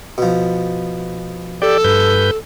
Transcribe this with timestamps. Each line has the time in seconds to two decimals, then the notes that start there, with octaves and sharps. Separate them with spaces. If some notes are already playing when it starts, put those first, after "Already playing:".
0.18 B2 F3
1.62 G4 A4 D5
1.84 G2 B4 G6